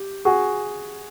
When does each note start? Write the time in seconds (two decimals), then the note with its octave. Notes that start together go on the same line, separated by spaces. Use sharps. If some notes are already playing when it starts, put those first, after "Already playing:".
Already playing: G4
0.25 F#4 G#4